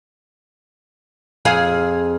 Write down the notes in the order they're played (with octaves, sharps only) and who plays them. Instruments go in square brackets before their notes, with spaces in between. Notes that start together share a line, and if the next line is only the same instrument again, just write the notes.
[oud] F2 G#4 F5